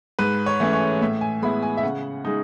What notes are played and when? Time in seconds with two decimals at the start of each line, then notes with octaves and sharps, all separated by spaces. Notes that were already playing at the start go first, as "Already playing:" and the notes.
0.19 G#2 B4
0.46 C#5
0.60 E3 A3 C#4
0.73 C#5
1.02 A2 E5
1.21 G#5
1.42 G#3 B3 E4 B5
1.63 G#5
1.77 E5
1.83 C#3 F#5
2.25 G#3 D#4